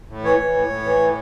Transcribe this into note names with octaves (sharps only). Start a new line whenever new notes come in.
A2
E3 C#5
E3
A2
A2
E3
A2